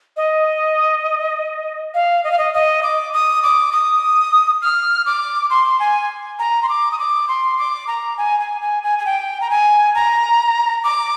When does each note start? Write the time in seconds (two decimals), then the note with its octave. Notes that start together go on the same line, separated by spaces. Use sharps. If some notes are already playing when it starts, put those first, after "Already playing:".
0.17 D#5
1.94 F5
2.24 D#5
2.31 F5
2.39 D#5
2.54 D#5
2.83 D6
3.13 D#6
3.43 D6
3.72 D#6
4.62 F6
5.06 D6
5.50 C6
5.80 G#5
6.39 A#5
6.63 C6
6.69 D6
6.92 D#6
6.99 D6
7.28 C6
7.58 D6
7.87 A#5
8.18 G#5
8.40 G#5
8.61 G#5
8.83 G#5
8.99 G#5
9.06 G5
9.41 A#5
9.50 G#5
9.95 A#5
10.84 D6